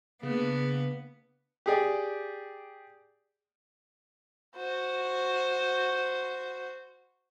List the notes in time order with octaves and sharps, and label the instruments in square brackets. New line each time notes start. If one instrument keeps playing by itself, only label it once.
[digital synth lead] C#3 [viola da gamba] A#3 D4 [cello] B3
[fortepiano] G4 G#4 D5
[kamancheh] F#4 C5